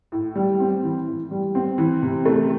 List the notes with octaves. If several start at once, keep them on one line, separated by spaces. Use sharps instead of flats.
A2
G3
C4
E3
A2
G3
C4
E3
C3
A3